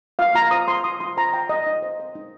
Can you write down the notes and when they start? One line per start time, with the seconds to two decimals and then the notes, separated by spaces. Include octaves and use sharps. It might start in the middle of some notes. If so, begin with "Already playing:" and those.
0.19 F4 F5
0.35 F4 A#5
0.51 C5 D#6
0.68 C5 C6
0.84 F4 D#6
1.00 F4 C6
1.17 C5 A#5
1.33 C5 G5
1.49 D#4 D#5
1.67 D#4
1.82 C5
2.00 C5
2.15 D#4